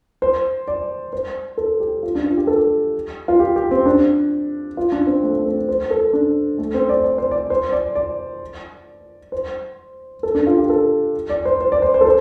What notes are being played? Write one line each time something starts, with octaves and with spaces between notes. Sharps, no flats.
C5
D5
C5
A4
G4
F4
D4
F4
G4
A4
G4
F4
G4
G4
C4
D4
F4
D4
C4
A3
A3
C4
C5
A4
D4
A3
C4
D5
D5
C5
D5
C5
D5
D5
C5
A4
D4
F4
G4
A4
D5
C5
C5
D5
C5
C5
A4
C5